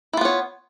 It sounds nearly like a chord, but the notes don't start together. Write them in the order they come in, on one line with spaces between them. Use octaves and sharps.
E4 F4 B3 C#5